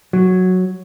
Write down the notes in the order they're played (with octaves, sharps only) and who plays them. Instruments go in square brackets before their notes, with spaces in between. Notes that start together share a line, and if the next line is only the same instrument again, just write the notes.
[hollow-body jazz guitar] F#3